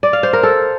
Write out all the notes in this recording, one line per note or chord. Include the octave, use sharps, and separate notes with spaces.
D5
F5
C5
A#4
A4